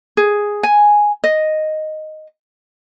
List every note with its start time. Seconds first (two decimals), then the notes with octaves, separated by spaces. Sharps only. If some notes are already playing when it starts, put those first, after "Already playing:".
0.17 G#4
0.63 G#5
1.24 D#5